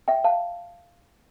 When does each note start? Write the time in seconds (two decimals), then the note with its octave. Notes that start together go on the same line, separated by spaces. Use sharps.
0.08 E5 G5
0.24 F5 A5